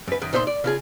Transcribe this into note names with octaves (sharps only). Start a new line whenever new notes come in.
F#2 B4
F#2 D#3
A#2 D#4 C5 E5 C6
D5
C#3 F4 G#4